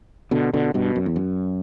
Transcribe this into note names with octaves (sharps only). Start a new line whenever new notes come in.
B2 D3
B2 D3
G2 B2
F#2
E2
F#2